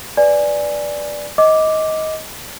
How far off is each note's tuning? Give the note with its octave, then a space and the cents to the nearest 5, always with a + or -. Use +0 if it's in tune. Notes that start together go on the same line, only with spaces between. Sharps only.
B4 +10 D5 +0 G#5 +0
D#5 +15 D6 +0